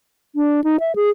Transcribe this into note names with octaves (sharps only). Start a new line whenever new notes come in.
D4
D#4
E5
G#4